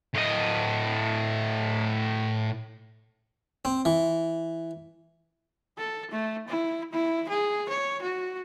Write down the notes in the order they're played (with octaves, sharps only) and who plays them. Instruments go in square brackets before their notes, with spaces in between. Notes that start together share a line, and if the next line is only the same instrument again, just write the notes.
[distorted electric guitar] A2 D#5
[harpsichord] C4
E3
[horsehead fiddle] A4
A3
E4
E4
G#4
C#5
F#4